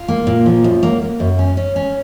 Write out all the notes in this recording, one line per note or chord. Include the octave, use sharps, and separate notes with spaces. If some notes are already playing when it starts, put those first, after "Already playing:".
Already playing: F4
A#3
A#2
F3
F#2
A#3
A#3
F#2
C#4
C#4
C#4